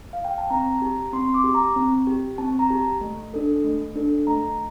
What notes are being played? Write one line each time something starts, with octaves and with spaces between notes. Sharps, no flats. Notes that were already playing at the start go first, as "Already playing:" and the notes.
F5
G5
A5
C4 A#5
G4
C4 C6
D6
G4
A#5
C4
G4
C4 A5
A#5
G4
A3
D4 A4
A3
D4 A4
A3 A#5